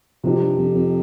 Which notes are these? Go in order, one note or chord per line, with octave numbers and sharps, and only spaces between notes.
F2 C3 F3 C4 D#4 G4
G2
F2
F2